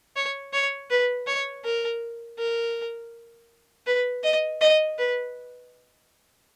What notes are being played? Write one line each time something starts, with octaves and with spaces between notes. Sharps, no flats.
C#5
C#5
B4
C#5
A#4
A#4
B4
D#5
D#5
B4